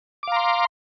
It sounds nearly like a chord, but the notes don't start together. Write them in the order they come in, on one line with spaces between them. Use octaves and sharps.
D6 F5 A#5 C6